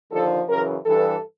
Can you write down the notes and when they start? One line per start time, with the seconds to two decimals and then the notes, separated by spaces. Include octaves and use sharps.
0.11 D#2 D3 F3 A4
0.48 F#2 C#3 E3 A#4
0.85 G2 E3 A4